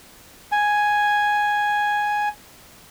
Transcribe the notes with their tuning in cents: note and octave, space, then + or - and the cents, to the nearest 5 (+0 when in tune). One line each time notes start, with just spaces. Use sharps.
G#5 +0